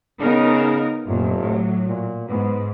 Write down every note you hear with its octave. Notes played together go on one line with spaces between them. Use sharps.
C#3 B3 D#4 A#4
F1 F#2 A#2
A2 F#3
A#2
G#2 B3